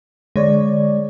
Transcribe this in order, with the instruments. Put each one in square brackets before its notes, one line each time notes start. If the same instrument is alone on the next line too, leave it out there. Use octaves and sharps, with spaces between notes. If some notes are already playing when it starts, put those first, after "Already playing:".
[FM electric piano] D3 C#5 D5 [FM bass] G#3